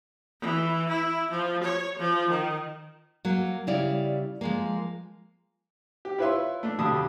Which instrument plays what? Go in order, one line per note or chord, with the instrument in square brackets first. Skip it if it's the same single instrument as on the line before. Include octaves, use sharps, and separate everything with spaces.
[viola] E3
E4
F3
C#5
F3
D#3
[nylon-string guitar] F#3 A#3
C#3 G3 E4 D5 F5
F3 G#3 A#3
[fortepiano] G4
E4 F4 B4 C#5 E5 C6
A3 D4
F2 B2 D3 G4 A5 D#6